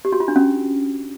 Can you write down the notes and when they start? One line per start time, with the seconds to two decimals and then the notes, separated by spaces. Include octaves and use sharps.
0.05 G4
0.12 F#4
0.20 F4
0.28 D4
0.36 C#4